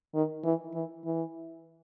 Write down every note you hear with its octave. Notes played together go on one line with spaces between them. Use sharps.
D#3
E3
E3
E3